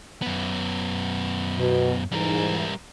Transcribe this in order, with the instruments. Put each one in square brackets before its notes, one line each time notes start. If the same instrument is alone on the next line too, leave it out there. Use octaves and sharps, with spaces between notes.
[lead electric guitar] F#2 B3
[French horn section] B2
[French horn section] G#2 E3 [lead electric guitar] G3 A#4